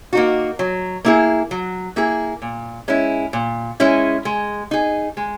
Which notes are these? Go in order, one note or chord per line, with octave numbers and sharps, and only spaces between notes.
A#3 D#4 F#4
F#3
A#3 E4 G#4
F#3
A#3 E4 G#4
A#2
G#3 C#4 E4
A#2
G#3 C#4 E4
G#3
D#4 G#4
G#3